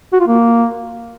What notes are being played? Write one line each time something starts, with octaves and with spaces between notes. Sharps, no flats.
F#4
F4
A#3